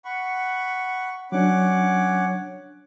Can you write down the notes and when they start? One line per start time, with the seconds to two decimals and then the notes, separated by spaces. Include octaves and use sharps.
0.05 F#5 B5 C#6
1.32 F#3 C#4 D4 F#5 D6